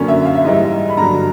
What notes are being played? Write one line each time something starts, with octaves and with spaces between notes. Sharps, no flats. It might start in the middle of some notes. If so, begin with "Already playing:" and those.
Already playing: F#2 D3 F#3 A#3 C#4
E5
F5
E5
G#2 E3 G3 D#5
E5
B5
G2 D3 F#3 A#5